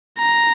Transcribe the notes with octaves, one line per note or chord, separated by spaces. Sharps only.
A#5